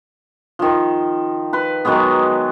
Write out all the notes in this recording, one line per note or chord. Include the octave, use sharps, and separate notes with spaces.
D#3 F3
B4 C6
D#3 F#3 G#3 B3